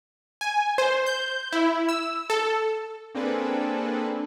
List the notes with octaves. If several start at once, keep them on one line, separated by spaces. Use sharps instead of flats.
G#5
C5
G6
E4
E6
A4
A#3 C4 D4 G#4 A4 B4